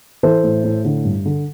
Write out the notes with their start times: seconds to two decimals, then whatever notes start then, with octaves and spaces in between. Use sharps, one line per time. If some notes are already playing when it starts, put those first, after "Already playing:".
0.23 E3 A4 C5
0.44 A2
0.64 A2
0.85 D3
1.05 G2
1.26 D3